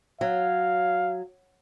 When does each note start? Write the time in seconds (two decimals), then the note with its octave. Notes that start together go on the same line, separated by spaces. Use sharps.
0.21 F#3 F5